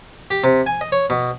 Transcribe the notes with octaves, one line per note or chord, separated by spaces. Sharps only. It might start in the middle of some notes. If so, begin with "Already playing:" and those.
G4
C3
G#5
D#5
C#5
B2